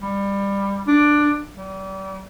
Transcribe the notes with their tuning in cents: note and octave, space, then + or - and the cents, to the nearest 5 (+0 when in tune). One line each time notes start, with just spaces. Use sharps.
G3 +20
D4 +10
G3 -35